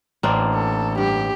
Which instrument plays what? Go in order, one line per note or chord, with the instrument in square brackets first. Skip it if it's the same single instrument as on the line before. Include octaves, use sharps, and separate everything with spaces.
[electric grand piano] A1 [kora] A#3 C4 D4
[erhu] A4
[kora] G2 [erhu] G4